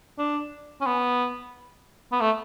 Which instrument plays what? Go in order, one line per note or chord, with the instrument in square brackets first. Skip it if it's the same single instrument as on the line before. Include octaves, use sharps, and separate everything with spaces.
[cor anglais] D4
C#4
B3
B3
A3